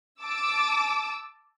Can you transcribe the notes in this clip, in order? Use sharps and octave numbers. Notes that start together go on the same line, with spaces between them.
A5 D6 E6